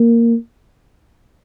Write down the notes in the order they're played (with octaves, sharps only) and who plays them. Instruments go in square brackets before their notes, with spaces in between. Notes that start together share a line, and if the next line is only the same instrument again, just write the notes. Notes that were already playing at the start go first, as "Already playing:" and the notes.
Already playing: [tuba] A#3